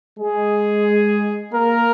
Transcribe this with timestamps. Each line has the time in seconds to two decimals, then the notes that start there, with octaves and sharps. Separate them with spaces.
0.20 G#3 G#4
1.54 A#3 A#4